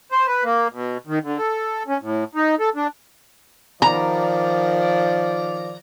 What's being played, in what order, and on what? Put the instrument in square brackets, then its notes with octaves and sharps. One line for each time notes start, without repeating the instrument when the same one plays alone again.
[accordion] C5
B4
A#3
B2
D#3
D3
A4
C#4
A2
D#4
A4
D4
[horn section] D#3 D5 [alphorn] F3 [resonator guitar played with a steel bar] A#5